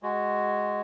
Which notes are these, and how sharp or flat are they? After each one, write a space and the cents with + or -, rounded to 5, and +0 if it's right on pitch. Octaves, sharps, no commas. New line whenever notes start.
G#3 +0 F#4 +0